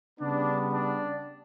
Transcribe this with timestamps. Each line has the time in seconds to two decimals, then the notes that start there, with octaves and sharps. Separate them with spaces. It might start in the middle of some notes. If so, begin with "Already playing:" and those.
0.20 C#3 G3 B3 D4
0.72 D4